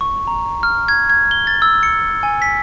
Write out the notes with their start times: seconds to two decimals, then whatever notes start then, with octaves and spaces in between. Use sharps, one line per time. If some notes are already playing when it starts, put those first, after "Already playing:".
0.01 C#6
0.27 A#5
0.63 F6
0.88 G#6
1.10 G#6
1.31 G7
1.47 A6
1.62 E6
1.83 C#7
2.23 G#5
2.42 B6